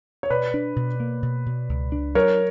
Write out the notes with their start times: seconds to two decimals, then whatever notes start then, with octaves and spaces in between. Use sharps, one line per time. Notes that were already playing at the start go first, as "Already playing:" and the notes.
0.23 C#5
0.30 B2 B4 D5
0.54 D4
0.76 B2
1.00 A#3
1.23 B2
1.46 B2
1.69 C#2
1.92 D4
2.15 F#3 A#4 C#5